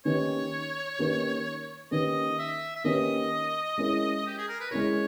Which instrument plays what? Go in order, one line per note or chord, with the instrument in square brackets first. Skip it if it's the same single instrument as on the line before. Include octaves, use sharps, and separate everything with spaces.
[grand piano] D#3 A#3 C#4 G4 B4 [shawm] C#5
[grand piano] D#3 A#3 C#4 G4 B4
[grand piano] D#3 A#3 C#4 G4 B4 [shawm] D#5
[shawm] E5
E5
[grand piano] D#3 A#3 C#4 G4 B4 [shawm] D#5
[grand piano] G#3 C#4 E4 A#4
[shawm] G4
G#4
A#4
B4
[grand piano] G#3 C#4 E4 A#4 [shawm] C#5